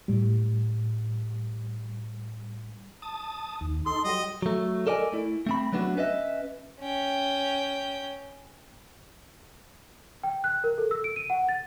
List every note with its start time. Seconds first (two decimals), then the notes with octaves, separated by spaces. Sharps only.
0.08 A2 G3
3.02 A5 D#6
3.61 D#2
3.86 D#4 A4 C6
4.04 F#3 G3 D#5
4.42 F#3 A3
4.87 A4 A#4 D5 D#5 G#5
5.13 A3 E4
5.46 A3 C4 B5
5.72 F#3 A3 B3 D4 F4 F#4
5.97 C#4 B4 D#5 E5
6.80 C#4 G5
10.23 G5
10.44 F#6
10.64 A#4
10.78 A4
10.91 E6
11.04 D7
11.16 D#7
11.30 F#5
11.49 A6